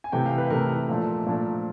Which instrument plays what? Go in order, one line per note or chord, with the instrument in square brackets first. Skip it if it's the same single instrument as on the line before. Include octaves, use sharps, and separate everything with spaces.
[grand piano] G#5
C3 E3 A3 G5
F5
B4
C3 E3 A3 A#4
A#2 F3 A3 D4
A#2 F3 A3 D4